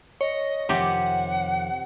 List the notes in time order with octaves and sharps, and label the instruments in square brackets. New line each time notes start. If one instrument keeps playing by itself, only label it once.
[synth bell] C#5 [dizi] D#5
[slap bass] F2 D#3 [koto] C3 G4 [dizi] F#5